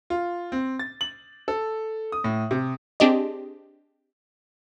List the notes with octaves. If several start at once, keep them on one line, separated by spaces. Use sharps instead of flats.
F4
C4
A6
F#7
A4
D#6
A2
C3
C4 D4 G4 G#4 D#5